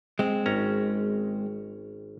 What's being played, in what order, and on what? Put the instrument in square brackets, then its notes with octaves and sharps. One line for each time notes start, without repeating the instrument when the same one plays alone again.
[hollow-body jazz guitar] G#3 C4
[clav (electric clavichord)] G#1 C#4 A#5